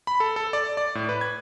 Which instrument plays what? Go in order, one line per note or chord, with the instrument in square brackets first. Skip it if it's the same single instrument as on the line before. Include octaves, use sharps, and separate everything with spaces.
[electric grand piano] B5
A4
A4
D5
D5
A2
B4
G#6